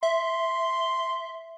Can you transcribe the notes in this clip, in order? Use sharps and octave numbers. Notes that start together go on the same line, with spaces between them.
E5 C6